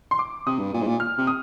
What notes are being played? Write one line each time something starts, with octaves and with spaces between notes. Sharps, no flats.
C6
D6
C3 D#6
G2
A#2
G#2
A#2
F6
C3
D#6